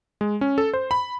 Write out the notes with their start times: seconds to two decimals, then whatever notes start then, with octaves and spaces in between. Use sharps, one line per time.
0.21 G#3
0.41 C#4
0.58 A4
0.74 C5
0.91 B5